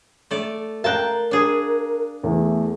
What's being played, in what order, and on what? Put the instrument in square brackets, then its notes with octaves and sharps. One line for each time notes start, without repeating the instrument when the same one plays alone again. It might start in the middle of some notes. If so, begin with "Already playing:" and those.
[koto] A3 D5
[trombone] A#4 [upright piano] F5 A#5 F#6 [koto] G5 A5
[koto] D4 G#4
[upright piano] E2 [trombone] A3